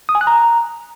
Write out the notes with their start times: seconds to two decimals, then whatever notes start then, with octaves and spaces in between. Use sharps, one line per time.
0.09 D#6
0.15 G#5
0.21 F#6
0.27 A#5